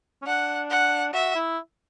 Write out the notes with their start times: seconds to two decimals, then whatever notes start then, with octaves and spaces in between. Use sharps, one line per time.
0.22 C#4
0.26 D4 F#5
0.70 F#5
1.13 F#4 E5
1.35 E4